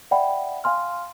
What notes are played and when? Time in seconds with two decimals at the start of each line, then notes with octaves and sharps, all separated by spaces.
0.11 D5 E5 F#5 G5 B5
0.64 F5 G#5 C6 F6